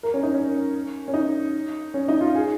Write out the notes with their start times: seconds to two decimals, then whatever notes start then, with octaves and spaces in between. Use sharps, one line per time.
0.03 A#4
0.14 C#4
0.23 D#4
0.34 C#4
1.08 C#4
1.14 D#4
1.94 C#4
2.08 D#4
2.21 F4
2.35 G#4